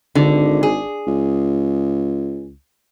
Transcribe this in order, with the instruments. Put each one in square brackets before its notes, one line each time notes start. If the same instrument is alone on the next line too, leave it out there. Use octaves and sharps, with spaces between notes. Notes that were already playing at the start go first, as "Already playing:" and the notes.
[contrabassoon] G#1 [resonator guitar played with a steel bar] D3
[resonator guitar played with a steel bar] G#4
[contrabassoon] C#2